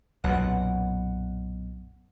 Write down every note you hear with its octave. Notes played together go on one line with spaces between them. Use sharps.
B1 F#2 A#2 F#5